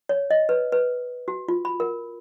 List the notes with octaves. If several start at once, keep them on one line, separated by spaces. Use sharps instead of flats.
C#5
D#5
B4
B4
F#4
F4
B5
A#4